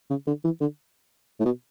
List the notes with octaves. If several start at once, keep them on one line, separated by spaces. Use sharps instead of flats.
C#3
D3
E3
D3
A2
B2